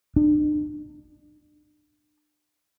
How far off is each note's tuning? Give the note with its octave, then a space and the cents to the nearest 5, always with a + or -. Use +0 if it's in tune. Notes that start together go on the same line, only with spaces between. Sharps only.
D4 +40